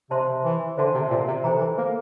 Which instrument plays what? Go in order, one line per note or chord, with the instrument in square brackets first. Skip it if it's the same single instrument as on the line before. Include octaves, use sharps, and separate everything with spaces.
[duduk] C3 [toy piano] C5 E5 A5 C6
[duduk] E3
[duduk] D3 [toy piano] C5 E5 A5 C6
[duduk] C3
A#2
C3
[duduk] E3 [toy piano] A4 C5 G5 A#5
[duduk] E3
A#3